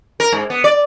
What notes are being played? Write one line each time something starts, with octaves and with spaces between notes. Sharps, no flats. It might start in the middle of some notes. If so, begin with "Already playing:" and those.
A#4
G#2
B3
D5